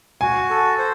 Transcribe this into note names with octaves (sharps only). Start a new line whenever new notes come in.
F#4 G#5
A4
C5